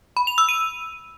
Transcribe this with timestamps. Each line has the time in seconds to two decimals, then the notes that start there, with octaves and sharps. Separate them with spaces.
0.17 B5
0.27 F7
0.38 E6
0.49 D#7